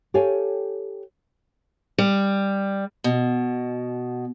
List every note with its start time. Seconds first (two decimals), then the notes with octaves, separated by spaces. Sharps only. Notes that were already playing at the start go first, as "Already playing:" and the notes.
0.14 G4 A4 C#5 F5 G5 G#5
1.98 G3
3.04 B2